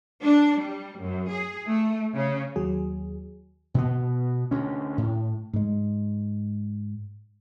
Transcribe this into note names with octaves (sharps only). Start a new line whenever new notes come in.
D4
G3
F#2
G#4
A3
C#3
D#2 F#3 G#4
B2 B3
D2 C#4
A2
G#2 G#3